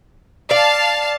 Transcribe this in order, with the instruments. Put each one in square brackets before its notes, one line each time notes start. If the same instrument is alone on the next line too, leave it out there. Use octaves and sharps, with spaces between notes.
[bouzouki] D5 [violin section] F5 A5